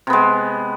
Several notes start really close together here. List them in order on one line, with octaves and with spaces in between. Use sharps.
C3 B3 G#3